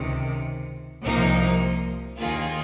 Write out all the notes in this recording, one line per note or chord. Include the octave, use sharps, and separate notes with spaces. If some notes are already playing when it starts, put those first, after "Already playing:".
Already playing: C#2 C3 D#3
C2 C3 F3 A#3 D#4
D#2 D#3 A#3 F4 G#4